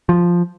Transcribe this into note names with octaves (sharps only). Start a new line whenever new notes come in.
F3